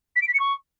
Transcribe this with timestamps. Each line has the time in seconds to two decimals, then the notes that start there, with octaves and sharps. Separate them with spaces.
0.15 B6
0.21 D7
0.27 B6
0.33 C#7
0.39 C#6